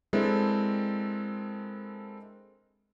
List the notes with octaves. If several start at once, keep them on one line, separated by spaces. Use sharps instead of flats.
G#3 C4 D4 E4 A4 A#4